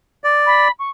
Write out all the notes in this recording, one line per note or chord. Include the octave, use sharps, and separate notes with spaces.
D5
B5
C#6